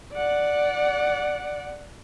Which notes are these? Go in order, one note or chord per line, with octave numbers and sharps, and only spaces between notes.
D5 F#5